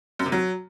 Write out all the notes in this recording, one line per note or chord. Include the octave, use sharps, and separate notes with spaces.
F#2
C3
F#3